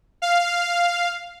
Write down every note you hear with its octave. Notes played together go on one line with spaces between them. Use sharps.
F5